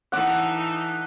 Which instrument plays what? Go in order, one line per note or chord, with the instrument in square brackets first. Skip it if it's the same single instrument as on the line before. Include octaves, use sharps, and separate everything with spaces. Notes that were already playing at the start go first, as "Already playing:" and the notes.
[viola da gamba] E3 D#4 A4 [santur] F#5 D6